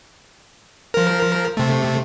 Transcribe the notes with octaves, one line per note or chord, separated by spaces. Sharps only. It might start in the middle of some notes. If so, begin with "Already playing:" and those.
F3 A#4
C3 A3